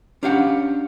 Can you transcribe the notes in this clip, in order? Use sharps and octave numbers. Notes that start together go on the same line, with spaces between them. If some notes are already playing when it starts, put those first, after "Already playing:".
C#4 D4 G4 F5 F#5